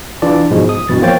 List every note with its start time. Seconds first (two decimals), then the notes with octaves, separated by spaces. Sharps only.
0.22 E3 D4 F4 D5
0.51 G#2 B2 F3 G#3
0.69 D#6
0.89 G2 B2 E3 A6
1.01 F3 A#3 C5 C#5 G5 A6